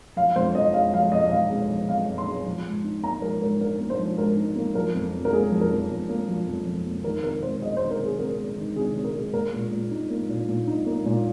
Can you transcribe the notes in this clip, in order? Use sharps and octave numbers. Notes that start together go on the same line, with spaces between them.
F3 F5
F2 C5
F2 D#5
G#3 F5
F3 F5
F2 D#5
F2 F5
G#3
F3
F2 F5
F2
C6
G#3
F3
G#2
D#4
A#3 A#5
F3 A#4
G#2 A#4
D#4 A#4
A#3
C5
F3
G#2 A#4
D#4
A#3
F3 A#4
F2
F2
A#4
A#3 G#4
F3
A#4
F2
F2
A#3
F3
F2
F2
A#3
D#3 A#4
C3 A#4
C3 C5
G#3 D#5
D#3 C5
A#4
C3
G#4
C3 A#4
G#3
D#3
C3 G#4
C3
A#4
G#3
A#3 A#4
A#2
A#2
D#4
A#3
A#2
A#2
D#4
A#3
A#2